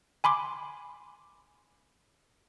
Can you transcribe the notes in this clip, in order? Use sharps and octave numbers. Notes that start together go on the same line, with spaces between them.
G#5 B5 C6 D6